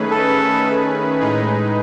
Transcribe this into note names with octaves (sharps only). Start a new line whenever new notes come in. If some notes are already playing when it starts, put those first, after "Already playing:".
Already playing: D#3 A3 C#4 G#4 B4
A4
A2 G#3 D#4 G#4 B4